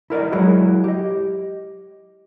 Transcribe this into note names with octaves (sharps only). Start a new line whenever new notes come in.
E4 A#4 D5 D#5
F#3 G#3 E4 F#4 G#4
G4 D#5